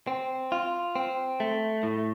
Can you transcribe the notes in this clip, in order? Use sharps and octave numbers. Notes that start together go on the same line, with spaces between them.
C4
F4
C4
A3
A2